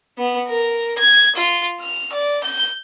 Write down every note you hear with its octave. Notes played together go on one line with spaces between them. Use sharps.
B3
A#4
G#6
F4
F6
D5
G6